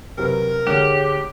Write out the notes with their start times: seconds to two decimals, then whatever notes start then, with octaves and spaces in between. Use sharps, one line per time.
0.18 C3 F#3 A#4 B4
0.67 D2 G4 G#4 C#5 F#6